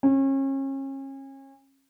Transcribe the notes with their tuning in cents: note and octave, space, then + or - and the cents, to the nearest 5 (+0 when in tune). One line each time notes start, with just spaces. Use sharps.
C#4 -35